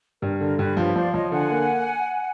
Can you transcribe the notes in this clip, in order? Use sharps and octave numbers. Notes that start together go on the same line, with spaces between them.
G2 A#4
D3 A#4
G2 B4
F3 B4 C#5
F3 C5 D5
F3 C#5 D#5
D3 F#5 G#5
A#3